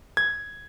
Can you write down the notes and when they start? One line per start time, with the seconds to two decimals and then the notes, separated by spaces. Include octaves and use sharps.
0.17 G#6